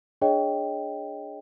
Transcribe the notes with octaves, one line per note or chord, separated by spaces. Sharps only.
D4 G#4 C#5 D#5 G5